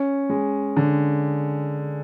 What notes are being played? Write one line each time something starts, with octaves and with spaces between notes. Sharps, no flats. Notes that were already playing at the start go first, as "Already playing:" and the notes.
Already playing: C#4
G#3
D3